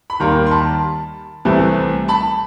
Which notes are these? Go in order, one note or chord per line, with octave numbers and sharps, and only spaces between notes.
B5
D#2 D#3 G3 A#3 A#5 C6
C6
A5 B5
C2 C3 E3 A3
A5 B5